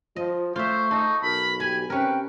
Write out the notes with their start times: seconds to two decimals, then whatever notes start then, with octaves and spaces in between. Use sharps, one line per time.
0.16 F3 D#5
0.56 A3 F4 C5 E5 C#6
0.91 D#4 A4
1.22 B1 A#4 B5
1.60 G4 G#5 B5
1.90 C3 C#4 A#4 B4 G5